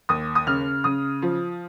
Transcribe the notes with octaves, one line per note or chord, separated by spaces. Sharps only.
D#2 D#6
D#6
C#3 F6
C#3 D#6
F3